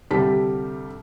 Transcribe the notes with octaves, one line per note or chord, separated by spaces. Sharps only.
C2 D3 G3 G4 A5 B6